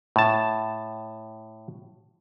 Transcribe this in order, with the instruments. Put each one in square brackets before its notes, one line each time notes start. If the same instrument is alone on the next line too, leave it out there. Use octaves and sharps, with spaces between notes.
[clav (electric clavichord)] A2 A5